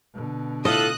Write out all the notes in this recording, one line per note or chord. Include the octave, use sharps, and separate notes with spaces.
B2 D3
A2 F4 A4 D#5 D#6 F#6